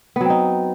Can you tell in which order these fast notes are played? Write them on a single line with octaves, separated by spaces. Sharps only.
B3 F#3 C4 D#4